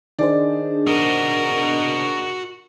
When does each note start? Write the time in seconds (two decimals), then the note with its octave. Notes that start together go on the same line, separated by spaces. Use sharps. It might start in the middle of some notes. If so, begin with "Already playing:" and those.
0.18 D#3 D4 G#4 C5 D5
0.87 F#4 A#4 D#5